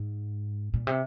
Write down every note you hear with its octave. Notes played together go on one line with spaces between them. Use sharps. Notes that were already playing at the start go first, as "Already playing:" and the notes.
Already playing: G#2
A#2
C3